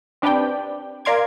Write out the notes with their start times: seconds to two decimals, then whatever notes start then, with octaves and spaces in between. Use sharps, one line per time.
0.22 C4 D4 G4 B4 D5 G5
1.05 A#4 D5 F5 C6 D6 G#6